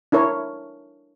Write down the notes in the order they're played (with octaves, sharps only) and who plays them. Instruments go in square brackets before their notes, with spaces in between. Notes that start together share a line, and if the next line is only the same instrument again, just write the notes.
[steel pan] D4 E4 A#4 C#5